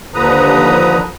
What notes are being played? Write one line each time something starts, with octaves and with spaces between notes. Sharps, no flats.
D#2 D3 F3 B4 A#5 D#6